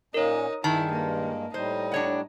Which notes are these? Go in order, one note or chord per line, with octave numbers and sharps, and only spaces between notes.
A#2 A#3 C#4 D#4 A#4 C#5
G2 D#3 G#3 E4 A5
A#3
A2 G3 D#4 C5
D4 C#5 F#5